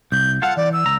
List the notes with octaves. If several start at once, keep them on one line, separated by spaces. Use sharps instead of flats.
C2 G6
F4 A4 F5 F#5
E3 D5
E6
C#2 A#5